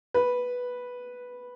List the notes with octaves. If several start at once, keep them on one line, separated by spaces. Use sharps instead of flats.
B4